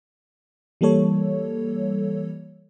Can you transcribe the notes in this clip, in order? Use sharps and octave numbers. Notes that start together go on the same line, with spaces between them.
E3 G3 A#3 A4 C#5